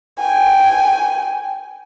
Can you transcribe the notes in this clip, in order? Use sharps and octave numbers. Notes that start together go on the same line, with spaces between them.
G5 G#5